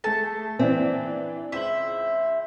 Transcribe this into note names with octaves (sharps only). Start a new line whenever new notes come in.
A3 G#4 A4 A5
E3 C4 D4 E5
C#2 C5 E5 F#7